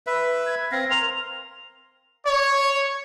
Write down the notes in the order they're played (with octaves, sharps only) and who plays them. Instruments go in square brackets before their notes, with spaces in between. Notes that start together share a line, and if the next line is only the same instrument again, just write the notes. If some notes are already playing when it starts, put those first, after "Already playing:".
[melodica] B4 E5
[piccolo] G#6
[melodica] C4 F5 [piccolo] A#6
[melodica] A#4 C6 [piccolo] F7
[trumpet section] C#5